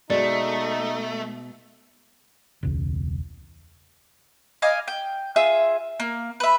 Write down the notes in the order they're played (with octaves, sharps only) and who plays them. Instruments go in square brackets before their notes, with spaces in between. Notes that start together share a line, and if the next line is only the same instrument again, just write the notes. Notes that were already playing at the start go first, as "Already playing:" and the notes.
[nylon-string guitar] B2 G#3 [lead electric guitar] A3 [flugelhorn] D#4 [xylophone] D5
[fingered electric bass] E1 C#2
[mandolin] D#5 F5 G#5 D6
G5
F4 G#4 E5
A#3
B4 E5